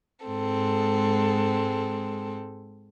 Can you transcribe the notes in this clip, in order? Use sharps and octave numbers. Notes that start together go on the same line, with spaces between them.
G#2 G#3 C4 A4